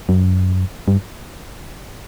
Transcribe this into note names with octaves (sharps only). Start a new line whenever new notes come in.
F#2
G2